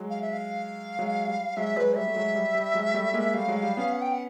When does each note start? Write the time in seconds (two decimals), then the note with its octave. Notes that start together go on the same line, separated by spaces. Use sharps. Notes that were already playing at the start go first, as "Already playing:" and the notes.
Already playing: F#3 G#3
0.10 F5
0.22 E5
0.33 F5
0.99 F#3 G#3
1.28 G3
1.57 F#3 G#3 E5
1.76 F#3 G#3 B4
1.96 G3 E5
2.08 A3
2.15 F#3 G#3
2.35 G3
2.55 G3
2.74 F#3 G#3
2.94 G3 A3
3.14 G#3 A#3
3.34 G3 A3 F5
3.48 F#3 G#3
3.63 G3
3.77 B3 C#4
3.92 F#5
4.02 G5
4.12 F#5